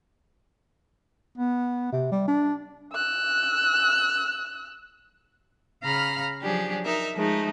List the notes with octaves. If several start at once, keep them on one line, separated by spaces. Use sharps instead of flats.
B3
C3
G3
D4
E6 F#6
C#3 F5 A#5 B5 F6
F3 F#3 D4 G4 G#4
D#4 A#4 E5
F3 G#3 A3 D#4